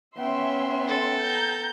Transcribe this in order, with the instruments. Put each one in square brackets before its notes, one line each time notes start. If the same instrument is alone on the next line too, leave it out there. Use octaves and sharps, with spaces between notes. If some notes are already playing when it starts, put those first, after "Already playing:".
[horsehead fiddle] B3 G5 [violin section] C#4 E5 C6
[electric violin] A4
[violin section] A#5 G6